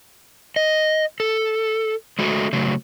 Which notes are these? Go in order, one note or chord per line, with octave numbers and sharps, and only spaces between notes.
D#5
A4
G#3 A3 F#4
C#3 F#3 A3